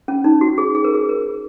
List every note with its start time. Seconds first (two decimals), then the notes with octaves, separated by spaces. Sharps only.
0.08 C#4
0.24 D#4
0.41 F#4
0.58 G#4
0.75 G#4
0.84 A#4
0.94 G#4
1.09 A#4